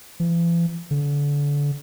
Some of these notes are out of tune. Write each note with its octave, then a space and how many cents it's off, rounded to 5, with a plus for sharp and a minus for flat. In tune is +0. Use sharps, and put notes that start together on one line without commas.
E3 +45
D3 -30